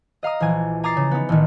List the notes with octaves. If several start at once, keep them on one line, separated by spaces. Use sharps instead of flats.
D#5 F5 A#5 D#6
A#1 E3 G#5
G#5 A#5 D6 D#6 A6 C7
C#3
B3 D#4
A1 D#3